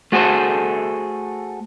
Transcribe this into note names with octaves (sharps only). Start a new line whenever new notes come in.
A3 F#4 G#4 A4 C5